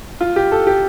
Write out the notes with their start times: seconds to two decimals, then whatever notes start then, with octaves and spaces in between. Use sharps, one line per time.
0.21 F4
0.36 G4
0.52 A4
0.67 G4